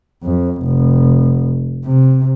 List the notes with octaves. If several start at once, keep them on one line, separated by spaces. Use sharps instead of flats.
F2
F1
C3